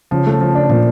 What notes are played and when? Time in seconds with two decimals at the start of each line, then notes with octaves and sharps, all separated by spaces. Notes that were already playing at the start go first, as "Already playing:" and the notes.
0.11 C#3 F3
0.27 A3
0.41 F3
0.55 D4
0.70 A#2 F3